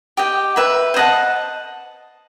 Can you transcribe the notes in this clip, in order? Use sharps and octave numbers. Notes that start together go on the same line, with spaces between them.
G4 D#5 G5
B4 E5 B5
C5 D#5 F#5 A5